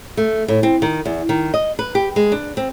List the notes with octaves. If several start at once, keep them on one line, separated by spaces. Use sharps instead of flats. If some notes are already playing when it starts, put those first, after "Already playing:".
A3
A2
C4
D#3
E2
D#3
D#5
B4
G4
G#3
D4
C4